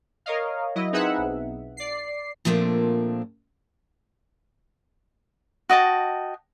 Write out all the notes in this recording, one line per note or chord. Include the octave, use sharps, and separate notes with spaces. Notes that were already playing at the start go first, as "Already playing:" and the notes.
A#4 C#5 D#5 F5
F#3 E4 D#5
C4 D#4 G#4 B4 E5 F#5
B1
D5 C7
A#2 F3 A3 A#3 C4 D4
F#4 D#5 G5 A5